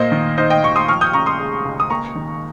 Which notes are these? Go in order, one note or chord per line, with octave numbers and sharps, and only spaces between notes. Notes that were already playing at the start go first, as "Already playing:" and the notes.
Already playing: A#2 A#3 C5 D#5
D#3
D#4 C5 D#5
D#5 G5
D#2 C#6
C6 D#6
F3 C#6 F6
D#6 G6
C#3 A#5 C#6
C6 D#6
G#3
C#2
D#6
A#3 A#5 C#6
D#3